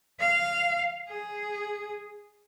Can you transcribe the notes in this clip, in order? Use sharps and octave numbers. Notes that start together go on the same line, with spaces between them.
F5
G#4